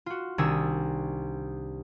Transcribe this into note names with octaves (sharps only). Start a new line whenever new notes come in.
F4 F#4
C2 D#3 D4 G#5 D#6 E6